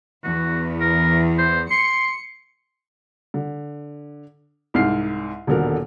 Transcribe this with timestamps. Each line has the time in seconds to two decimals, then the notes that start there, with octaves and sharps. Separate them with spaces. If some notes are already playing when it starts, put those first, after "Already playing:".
0.24 E2 F#4
0.80 A#4
1.38 C5
1.71 C6 C#7
3.34 D3
4.74 C2 G#2 F6 C7
5.47 D#1 B2 D3 A#4